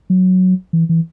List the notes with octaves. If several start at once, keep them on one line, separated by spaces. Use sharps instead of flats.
F#3
E3
E3